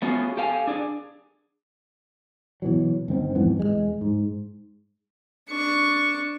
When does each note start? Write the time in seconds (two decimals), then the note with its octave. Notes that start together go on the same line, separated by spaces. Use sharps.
0.02 A3 B3 C#4 F4 F#4 G#4
0.37 G4 A4 F5 G5 G#5
0.67 D4 G#4 D5
2.62 B2 E3 F#3
3.08 G1 D#3 C4
3.35 F2 G#2 E3 B3
3.59 E1 D#2 G#3
4.01 G#2
5.50 D4 C#6